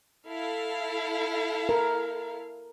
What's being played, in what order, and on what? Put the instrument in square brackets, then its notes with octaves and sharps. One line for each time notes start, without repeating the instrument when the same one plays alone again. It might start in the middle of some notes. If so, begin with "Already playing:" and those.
[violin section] E4 A4 F5
[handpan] A#4